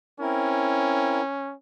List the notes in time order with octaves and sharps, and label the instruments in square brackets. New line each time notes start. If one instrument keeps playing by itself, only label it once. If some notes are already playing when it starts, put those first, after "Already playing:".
[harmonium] C4 E4 A#4 [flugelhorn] C#4